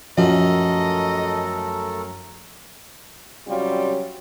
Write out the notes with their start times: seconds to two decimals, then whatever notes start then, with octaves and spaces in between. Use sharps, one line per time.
0.18 F#2 F3 A3 A4 A#4 D#5
3.47 C3 F#3 G3 C#4 F4 F#4